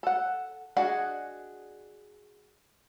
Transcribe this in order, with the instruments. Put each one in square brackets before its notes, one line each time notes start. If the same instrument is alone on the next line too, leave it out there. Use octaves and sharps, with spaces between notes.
[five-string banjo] A4 F#5
D4 F#4 G#4 D#5 F#5